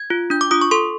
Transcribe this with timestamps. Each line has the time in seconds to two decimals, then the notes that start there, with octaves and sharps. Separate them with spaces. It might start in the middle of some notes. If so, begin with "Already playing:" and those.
Already playing: G#6
0.10 F4
0.30 D4 G6
0.41 D6
0.51 F4 D#6
0.61 C#6
0.71 A4 C6